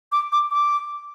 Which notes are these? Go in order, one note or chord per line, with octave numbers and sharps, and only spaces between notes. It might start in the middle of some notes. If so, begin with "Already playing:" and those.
D6
D6
D6